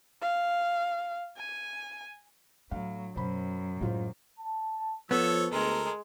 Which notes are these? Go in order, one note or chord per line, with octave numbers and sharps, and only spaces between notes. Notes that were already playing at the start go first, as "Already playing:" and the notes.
F5
G#5
A2 F#3 D4 F5
F#2 B2 C5 B5
A2 G#3 F4 C5
A5
F3 B3 A4 C#5 E6
D2 G#3 A4 A#4